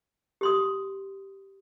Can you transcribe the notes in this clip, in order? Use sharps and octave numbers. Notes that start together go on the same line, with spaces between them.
G4 C6 D#6